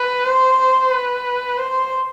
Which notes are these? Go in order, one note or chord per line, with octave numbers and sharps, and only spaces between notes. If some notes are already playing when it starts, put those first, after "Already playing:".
Already playing: B4
C5
B4
C5